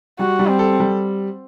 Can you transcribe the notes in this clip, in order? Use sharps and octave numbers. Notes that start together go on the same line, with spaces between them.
G3 F#4
G3
C4
A4
G3